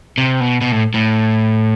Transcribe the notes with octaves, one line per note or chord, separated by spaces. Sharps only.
C3
B2
B2
A2
A2